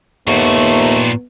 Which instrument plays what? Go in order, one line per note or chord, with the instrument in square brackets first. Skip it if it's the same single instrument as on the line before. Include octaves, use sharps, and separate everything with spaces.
[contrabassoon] D#2 [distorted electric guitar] A#2 F#4 [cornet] A3 [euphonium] B3